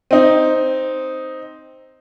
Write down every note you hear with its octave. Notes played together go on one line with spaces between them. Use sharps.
C4 D#4